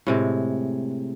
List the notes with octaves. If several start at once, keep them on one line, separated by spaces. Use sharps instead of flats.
A2 C3 G#3